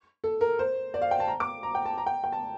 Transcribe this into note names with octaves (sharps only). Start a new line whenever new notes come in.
A4
A#4
C5
D5
F5
G5
A5
A#5
D6
A#5
G5
A5
A#5
G5
G5
A5